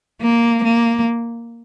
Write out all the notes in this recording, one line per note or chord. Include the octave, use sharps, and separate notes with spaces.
A#3
A#3